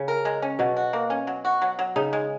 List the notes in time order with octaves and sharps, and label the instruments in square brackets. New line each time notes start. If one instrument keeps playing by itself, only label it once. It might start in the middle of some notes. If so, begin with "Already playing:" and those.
Already playing: [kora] C#3
[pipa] A#4
G#3
C#4
[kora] B2 [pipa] F#3
[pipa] F#4
A#3
C#4
F#3
F#4
F#3
F#3
[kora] C#3 [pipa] D#4
[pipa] G#3